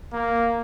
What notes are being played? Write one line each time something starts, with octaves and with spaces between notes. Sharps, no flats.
A#3